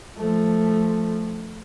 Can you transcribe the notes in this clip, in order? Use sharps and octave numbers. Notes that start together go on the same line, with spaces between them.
F3 A3